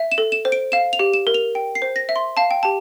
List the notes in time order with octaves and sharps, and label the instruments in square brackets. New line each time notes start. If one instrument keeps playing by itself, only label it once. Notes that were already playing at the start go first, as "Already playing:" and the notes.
Already playing: [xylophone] E5
E7
A4
E7
C5
D7
F5 E7
F7
G4
E7
A#4
F7
G5
C7
C5
A#6
E5
C6
F5 A5
G5
G4 A5